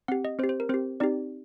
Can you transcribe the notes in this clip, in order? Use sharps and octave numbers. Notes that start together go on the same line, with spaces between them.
C4 G4 F#5
D#5
C4 G4 C5
C5
A#4
C4 G4 C5
C4 D#4 G4 D5